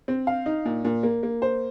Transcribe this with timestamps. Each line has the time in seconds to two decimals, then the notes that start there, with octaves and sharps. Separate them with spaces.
0.08 C4
0.27 F5
0.46 D#4
0.65 A#2
0.85 A#2
1.03 A#3
1.23 A#3
1.42 C5